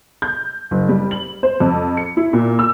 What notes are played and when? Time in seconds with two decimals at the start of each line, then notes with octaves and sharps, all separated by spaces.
0.22 G6
0.71 F#1
0.89 G3
1.11 F#7
1.43 C5
1.60 F2
1.97 C#7
2.17 E4
2.33 A#2
2.59 E6